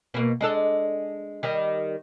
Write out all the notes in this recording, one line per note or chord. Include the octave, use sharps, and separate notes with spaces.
B2 A#3
G#3 D4 A4
D#3 G3